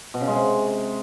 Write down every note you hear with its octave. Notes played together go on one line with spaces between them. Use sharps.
B2
C#3
G#3
C3